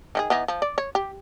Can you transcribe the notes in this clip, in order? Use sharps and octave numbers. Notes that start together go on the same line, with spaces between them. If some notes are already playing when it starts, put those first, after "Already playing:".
D#3 E4 G#4
E3 B3 D#4
F3
D5
C#5
G4